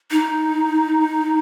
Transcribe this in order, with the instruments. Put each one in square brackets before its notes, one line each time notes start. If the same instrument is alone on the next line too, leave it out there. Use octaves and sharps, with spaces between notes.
[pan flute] D#4